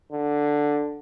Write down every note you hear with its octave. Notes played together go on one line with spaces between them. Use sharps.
D3